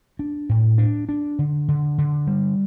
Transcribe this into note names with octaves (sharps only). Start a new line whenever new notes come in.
D4
A2
D4
D4
D3
D3
D3
G3